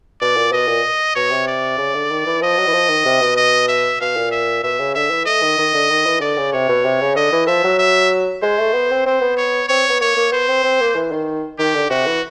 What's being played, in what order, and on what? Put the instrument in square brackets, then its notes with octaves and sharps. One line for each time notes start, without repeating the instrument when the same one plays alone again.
[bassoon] B2 [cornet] D5
[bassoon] A#2
[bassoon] B2 [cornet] D#5
[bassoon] A#2
[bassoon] B2 [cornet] C#5
[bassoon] C3
[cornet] D5
[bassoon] C#3
D3
D#3
E3
[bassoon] F3 [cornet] D#5
[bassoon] F#3
E3
F3
D#3
C3
B2
[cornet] D#5
E5
[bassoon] B2 [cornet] F5
[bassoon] A#2
[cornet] E5
[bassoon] B2 [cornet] E5
[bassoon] C#3
[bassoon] D3 [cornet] E5
[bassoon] E3
[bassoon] A3 [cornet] D#5
[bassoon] D#3
D#3
D3
D#3
E3
[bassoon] D3 [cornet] D5
[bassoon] C#3
[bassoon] C3 [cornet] C#5
[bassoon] B2
C3
C#3
[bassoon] D3 [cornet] D#5
[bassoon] E3
[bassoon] F3 [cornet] E5
[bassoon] F#3
[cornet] E5
[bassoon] G#3 [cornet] C5
[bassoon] A3
B3
C4
[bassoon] C4 [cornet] C5
[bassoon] B3
[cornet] C#5
[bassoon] C4 [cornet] C#5
[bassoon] B3
[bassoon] A#3 [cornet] C#5
[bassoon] A#3
[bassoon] B3 [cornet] C5
[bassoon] C4
C4
A#3
E3
D#3
[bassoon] D#3 [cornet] G4
[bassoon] D3
[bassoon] C3 [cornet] F#4
[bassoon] E3